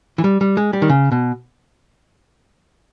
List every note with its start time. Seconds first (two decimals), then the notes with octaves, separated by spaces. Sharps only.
0.18 E3
0.24 G3
0.41 G3
0.57 G#3
0.73 G3
0.82 D#3
0.89 C#3
1.12 B2